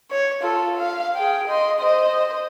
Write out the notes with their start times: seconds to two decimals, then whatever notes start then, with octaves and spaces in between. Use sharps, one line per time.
0.11 C#5
0.41 F4 A4
0.77 F5
1.15 G#4 G5
1.47 D#5 C6
1.79 C5 D#5